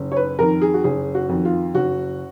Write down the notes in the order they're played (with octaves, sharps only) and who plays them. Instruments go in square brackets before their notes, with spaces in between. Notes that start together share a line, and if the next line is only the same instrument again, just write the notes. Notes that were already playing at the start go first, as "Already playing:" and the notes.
Already playing: [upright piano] F#1
C#5
B4
F2 D#3 A#4
G#4
F#4
F#1 G#4
F#4
F2 D#3
F4
F#1 F#4